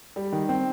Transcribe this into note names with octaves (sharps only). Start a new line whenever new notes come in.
G3
D#3
C4